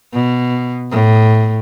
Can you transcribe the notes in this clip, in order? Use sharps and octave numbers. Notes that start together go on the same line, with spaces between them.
B2
A2